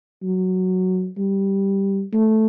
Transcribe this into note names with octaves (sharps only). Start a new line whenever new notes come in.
F#3
G3
A3